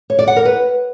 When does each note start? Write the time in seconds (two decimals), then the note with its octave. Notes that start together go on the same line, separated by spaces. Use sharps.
0.10 C#5
0.19 D5
0.28 F#5
0.36 A#4
0.45 B4